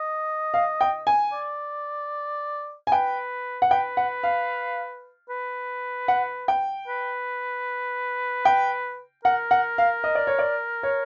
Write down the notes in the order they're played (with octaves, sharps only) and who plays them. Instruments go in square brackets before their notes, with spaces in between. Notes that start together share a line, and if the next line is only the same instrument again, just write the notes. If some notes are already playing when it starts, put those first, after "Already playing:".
Already playing: [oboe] D#5
[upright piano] F5
G5
G#5
[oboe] D5
[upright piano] G#5
[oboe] B4 [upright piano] G5
[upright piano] F#5
[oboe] B4 [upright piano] G5
[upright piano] F#5
F5
[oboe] B4
[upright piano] F#5
G5
[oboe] B4
[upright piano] G5
[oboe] A#4 [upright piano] F#5
[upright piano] F#5
F5
D#5
D5
C#5
D5
C#5